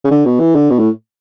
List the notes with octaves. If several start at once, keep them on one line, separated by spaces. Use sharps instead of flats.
C#3
D3
B2
E3
D3
B2
A2